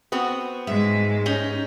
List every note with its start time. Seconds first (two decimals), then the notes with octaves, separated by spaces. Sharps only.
0.12 B3 C4 F#4
0.67 G#2 G#3 E5
1.26 C#4 D#4 G4